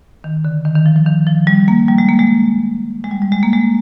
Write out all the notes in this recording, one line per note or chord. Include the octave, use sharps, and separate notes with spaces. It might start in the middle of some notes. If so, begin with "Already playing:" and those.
D#3
D3
D#3
D#3
F3
F3
D#3
F3
G3
A#3
G3
G#3
A#3
G#3
G#3
G3
G3
G#3
A#3
G#3